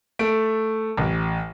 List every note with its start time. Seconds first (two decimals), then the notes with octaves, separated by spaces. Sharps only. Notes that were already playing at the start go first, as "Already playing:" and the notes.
0.19 A3 D7
0.97 A1